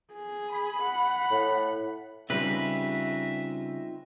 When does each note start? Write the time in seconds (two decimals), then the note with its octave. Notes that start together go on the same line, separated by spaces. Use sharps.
0.13 G#4
0.51 B5
0.82 F#5
1.31 A2
2.30 C#3 G3 C4 D#4 F4 B4 E5